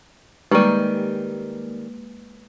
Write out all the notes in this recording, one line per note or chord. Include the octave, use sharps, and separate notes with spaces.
D#3 G3 G#3 A#3 G4 B4 F6 D#7